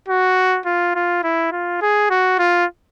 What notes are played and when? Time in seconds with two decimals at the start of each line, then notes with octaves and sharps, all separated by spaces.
0.08 F#4
0.66 F4
0.95 F4
1.24 E4
1.52 F4
1.82 G#4
2.10 F#4
2.39 F4